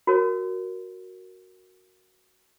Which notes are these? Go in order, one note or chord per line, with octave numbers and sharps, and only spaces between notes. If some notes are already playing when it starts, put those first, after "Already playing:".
F#4 A#4 C#5